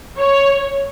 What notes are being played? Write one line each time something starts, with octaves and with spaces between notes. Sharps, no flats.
C#5